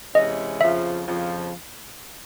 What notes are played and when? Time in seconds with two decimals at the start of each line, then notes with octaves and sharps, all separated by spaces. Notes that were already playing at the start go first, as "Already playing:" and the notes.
0.15 C3 E3 G#3 C#4 D#5
0.60 F2 C#3 F3 E5
1.06 F2 C#3 F3